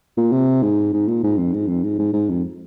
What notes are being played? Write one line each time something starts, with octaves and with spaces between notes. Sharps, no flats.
A#2
C3
G#2
G#2
A#2
G#2
F2
G#2
F2
G#2
G#2
G#2
F2